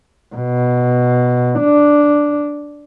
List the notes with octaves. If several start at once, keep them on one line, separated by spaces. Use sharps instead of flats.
B2
D4